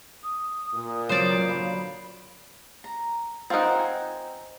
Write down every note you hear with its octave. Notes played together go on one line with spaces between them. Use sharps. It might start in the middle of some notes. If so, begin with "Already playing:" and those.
D#6
A#2
C#3 F#3 B3 C5 D5
D3 F#3 F5 B5
A#5
C4 D#4 F4 A#4 F#5
G#5